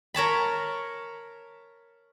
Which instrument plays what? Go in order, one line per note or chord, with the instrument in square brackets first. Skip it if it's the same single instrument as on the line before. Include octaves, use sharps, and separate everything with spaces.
[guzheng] A#4 C#5 A5 B5